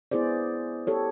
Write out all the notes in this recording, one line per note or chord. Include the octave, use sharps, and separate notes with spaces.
B3 E4 G#4 C5 D5
G4 A4 C#5